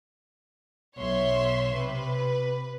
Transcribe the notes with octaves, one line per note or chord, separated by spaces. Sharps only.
B1 C#5 E5 C6
C3 B4